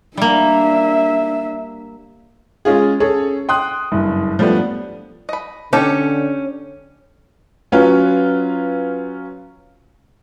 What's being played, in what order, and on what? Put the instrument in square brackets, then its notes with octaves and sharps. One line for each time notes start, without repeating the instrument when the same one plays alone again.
[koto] G3 A#3 [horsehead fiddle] D4 E5
[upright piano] G#3 C#4 F4 G#4
C#4 G#4 A4 C#5
G5 C6 D#6 F#6
F#1 G2
F3 G3 A3 B3 D4
[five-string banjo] D#5 B5
[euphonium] D3 [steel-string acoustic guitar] C#4 [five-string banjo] D#4 G4 A4
[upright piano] F#3 C#4 F4 B4